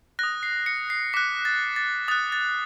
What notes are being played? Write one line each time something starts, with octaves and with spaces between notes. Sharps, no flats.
D#6 F#6 A#6
C7
C#7
C7
D6 F#6 B6
A6
A6
D#6 F#6 A6
A6